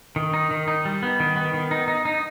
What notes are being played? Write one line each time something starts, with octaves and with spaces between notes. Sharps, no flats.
D#3
D#4
D#3
D#4
G3
B3
D#3
B3
D#3
D#4
D#4
D#4